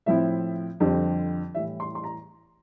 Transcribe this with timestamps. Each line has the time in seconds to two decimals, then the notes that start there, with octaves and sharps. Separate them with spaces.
0.06 A2 F3 C4 E4 E5
0.80 F2 D3 G3 C4
1.54 A2 E3 G3 E5
1.80 C6
1.95 C6
2.04 A#5